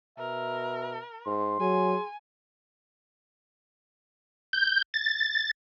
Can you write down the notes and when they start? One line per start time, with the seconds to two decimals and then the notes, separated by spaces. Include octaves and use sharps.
0.19 B2 A#4 E5
1.26 G#2 C6
1.60 F#3 G#4 G#5
4.53 G6
4.94 A6